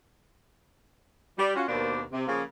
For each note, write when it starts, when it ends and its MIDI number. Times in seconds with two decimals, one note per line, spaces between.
1.39 1.54 55
1.56 1.65 61
1.56 1.65 65
1.56 1.65 66
1.68 2.02 39
1.68 2.02 47
1.68 2.02 58
1.68 2.02 62
1.68 2.02 72
1.68 2.02 74
2.13 2.26 48
2.28 2.43 49
2.28 2.43 53
2.28 2.43 58